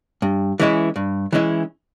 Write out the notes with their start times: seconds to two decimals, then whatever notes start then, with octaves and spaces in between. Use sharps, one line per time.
0.22 G2
0.60 E3 G#3 C#4 E4
0.96 G2
1.33 E3 G#3 C#4 E4